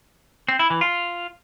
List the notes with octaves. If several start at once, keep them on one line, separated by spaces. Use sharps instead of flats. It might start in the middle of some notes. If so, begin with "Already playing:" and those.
C4
E4
E3
F4